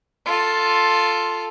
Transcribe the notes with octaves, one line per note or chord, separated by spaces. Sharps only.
F4 A4